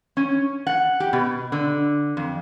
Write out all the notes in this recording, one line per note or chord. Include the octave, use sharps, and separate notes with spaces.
C#4
F#5
G4
B2
D3
F2